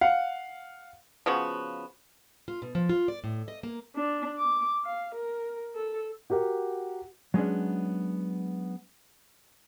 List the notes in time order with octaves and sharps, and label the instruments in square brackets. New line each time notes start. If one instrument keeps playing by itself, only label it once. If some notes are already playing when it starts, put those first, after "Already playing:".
[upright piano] F5 F#5
[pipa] C#3 F3 B3 F#4
[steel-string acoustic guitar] F4
B2
F3
F4
D5
A2
D#5
A#3
[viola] D4
D6
F5
A#4
A4
[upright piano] F#4 G4 A#4 F#5
[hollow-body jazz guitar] F#3 G#3 B3 C#4 D4